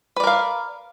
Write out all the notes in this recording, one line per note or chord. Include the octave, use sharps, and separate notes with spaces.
A#4 B4 D5 F5